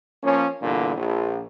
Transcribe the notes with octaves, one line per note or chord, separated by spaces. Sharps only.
F3 A#3 C#4
E2 G2 A#2 D3
A#1